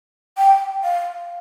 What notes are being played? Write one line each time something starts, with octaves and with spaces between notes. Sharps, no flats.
G5
F5